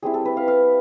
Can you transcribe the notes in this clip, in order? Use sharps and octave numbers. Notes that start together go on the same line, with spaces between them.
G3 C4 E4 G#4
A4
B4
F5
F5